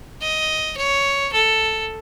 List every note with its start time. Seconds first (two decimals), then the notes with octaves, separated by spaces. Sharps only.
0.22 D#5
0.77 C#5
1.33 A4